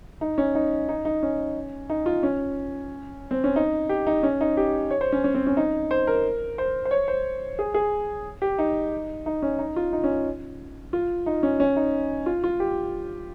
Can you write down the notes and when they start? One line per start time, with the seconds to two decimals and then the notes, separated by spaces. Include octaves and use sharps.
0.21 D#4
0.38 C#4
0.55 D#4
0.89 D#4
1.05 D#4
1.23 C#4
1.90 D#4
2.06 F4
2.23 C#4
3.31 C4
3.44 C#4
3.56 D#4
3.89 G4
4.07 D#4
4.23 C#4
4.41 D#4
4.57 G4
4.91 C#5
5.01 C5
5.12 C#4
5.24 C#4
5.34 C4
5.47 C#4
5.57 D#4
5.91 C5
6.07 A#4
6.58 C5
6.85 C5
6.91 C#5
7.08 C5
7.59 G#4
7.74 G#4
8.42 G4
8.59 D#4
9.26 D#4
9.42 C#4
9.59 D#4
9.76 F4
9.93 D#4
10.04 C#4
10.93 F4
11.26 D#4
11.43 C#4
11.60 C#4
11.76 D#4
12.26 F4
12.44 F4
12.60 G4